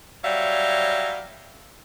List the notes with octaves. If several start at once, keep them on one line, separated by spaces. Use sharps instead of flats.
F#3 G3 C#5 E5 F5